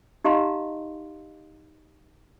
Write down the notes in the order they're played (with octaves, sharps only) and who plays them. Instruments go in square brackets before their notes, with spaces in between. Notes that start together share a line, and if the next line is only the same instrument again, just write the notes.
[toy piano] D#4 G4 D#5 F5 A#5 C6